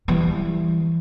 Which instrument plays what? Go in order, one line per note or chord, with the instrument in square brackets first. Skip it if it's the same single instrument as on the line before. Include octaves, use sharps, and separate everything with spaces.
[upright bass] E3 G3